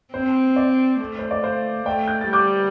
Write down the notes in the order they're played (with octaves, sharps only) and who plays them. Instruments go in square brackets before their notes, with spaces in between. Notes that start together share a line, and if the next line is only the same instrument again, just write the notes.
[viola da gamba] C4 [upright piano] C5
[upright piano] D5
[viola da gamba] A3
[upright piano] C5
D5
C5 F5
[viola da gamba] A3 [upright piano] D5 G5
[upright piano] G6
A6
[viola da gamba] G3 [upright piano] D6 G6